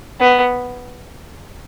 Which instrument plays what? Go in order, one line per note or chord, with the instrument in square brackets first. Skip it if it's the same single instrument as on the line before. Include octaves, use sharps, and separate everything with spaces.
[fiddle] B3